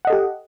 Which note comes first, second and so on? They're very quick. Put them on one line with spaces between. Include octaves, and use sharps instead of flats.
F#5 D#5 A4 G4